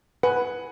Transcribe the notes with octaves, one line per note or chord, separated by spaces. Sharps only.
B4 F#5 G#5